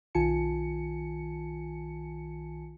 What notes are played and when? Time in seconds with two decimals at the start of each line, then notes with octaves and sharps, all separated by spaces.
0.15 B1 D#3 F4 G#5 A5 C#7